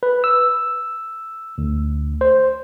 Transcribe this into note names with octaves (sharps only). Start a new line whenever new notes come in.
B4
E6
D2
C5